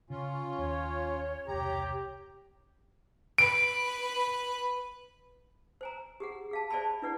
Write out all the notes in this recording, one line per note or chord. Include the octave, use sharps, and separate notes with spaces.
C#3 C#4 F4
D#2 C#5
E1 C2 G4 A#5
B4 D7
C5 G#5 A#5
G4 G#4 F#5
G#4 F5 A5
C5 D5 E5 G#5 A5 B5
D4 E4 B4 D5 F#5